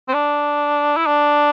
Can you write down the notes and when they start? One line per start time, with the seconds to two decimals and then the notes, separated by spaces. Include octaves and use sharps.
0.08 C4
0.14 D4
0.97 E4
1.06 D4